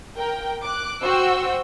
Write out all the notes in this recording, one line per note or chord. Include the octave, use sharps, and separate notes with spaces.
A#4 G5
D6 F#6
F#4 C5 G5 E6